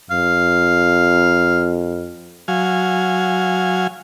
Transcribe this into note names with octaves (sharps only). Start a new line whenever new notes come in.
F2 F5
F#3 F5 G#5